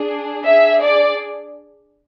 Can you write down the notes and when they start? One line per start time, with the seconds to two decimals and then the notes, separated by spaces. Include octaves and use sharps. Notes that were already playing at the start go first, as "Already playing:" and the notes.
Already playing: D4 G#4
0.45 D4 G#4 E5
0.82 D5